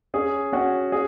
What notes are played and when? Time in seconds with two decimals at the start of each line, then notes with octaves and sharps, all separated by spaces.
0.14 C#4 G#4
0.53 C#4 F#4
0.92 G#4